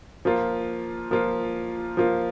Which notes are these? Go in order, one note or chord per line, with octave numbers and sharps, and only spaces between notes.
F3 A#3 F4
F3 A#3 F4
F3 A#3 F4